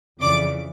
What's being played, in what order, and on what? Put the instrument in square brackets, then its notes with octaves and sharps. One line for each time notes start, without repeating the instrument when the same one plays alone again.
[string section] F2 C#3 E3 D5 D6